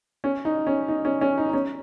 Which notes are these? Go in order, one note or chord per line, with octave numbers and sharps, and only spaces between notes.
C#4
D#4
C#4
D#4
C#4
C#4
D#4
D#4
C#4